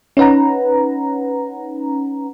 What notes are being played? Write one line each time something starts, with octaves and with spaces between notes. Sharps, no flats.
C#4 D#4 B4 F#5 A#5